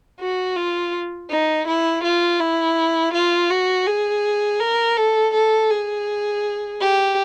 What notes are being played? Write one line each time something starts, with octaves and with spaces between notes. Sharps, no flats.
F#4
F4
D#4
E4
F4
E4
F4
F#4
G#4
A#4
A4
A4
G#4
G4